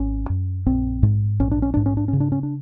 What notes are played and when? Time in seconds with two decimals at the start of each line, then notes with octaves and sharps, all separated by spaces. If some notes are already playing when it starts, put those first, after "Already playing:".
Already playing: G#1 C#4
0.30 F#2
0.66 A#1 C4
1.03 G#2
1.40 A#1 C#4
1.51 D4
1.62 C#4
1.74 G#2 D4
1.86 C#4
1.97 D4
2.08 C#4
2.13 C#3
2.20 D4
2.32 C#4
2.43 D4